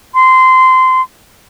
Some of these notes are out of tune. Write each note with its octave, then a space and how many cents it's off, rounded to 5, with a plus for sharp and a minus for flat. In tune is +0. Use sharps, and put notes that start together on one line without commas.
C6 -20